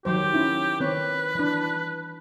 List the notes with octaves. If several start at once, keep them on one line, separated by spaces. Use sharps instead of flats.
D#3 F#3 G4 C5
C#4 D#4 E4
D#3 C4 B4 C#5
E3 D4